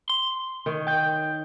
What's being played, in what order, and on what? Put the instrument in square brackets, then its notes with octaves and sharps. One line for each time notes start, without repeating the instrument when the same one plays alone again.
[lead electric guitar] C6
[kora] D#3 C#5
[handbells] G5 G6